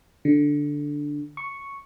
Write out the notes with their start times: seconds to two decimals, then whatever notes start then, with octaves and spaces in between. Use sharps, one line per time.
0.25 D3
1.37 C#6